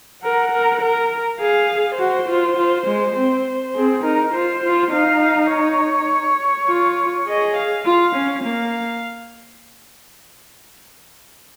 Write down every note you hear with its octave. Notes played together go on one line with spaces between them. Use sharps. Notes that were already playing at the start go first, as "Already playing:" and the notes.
A#4 F#5
A#4
A#4
G#4 F5
F#4 C5
F4
F4
G#3
C4
C4 G#4
D#4 A#4
F4 C5
F4
D#4 F5
C#5
F4
G#4 D#5
F5
F4 F5
C#4
A#3 F5